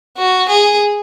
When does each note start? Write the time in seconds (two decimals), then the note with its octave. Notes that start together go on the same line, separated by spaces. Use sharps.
0.18 F#4
0.49 G#4